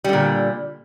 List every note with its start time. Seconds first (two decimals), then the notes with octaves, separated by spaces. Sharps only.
0.04 G3
0.09 D3
0.13 A#2